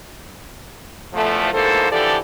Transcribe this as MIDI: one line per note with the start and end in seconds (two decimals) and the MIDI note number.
1.14 1.50 40
1.14 1.50 53
1.14 1.50 57
1.52 1.87 38
1.52 1.87 44
1.52 1.87 52
1.52 1.87 58
1.52 1.87 69
1.52 1.87 72
1.91 2.17 50
1.91 2.17 52
1.91 2.17 53
1.91 2.17 67
1.91 2.17 69
1.91 2.17 74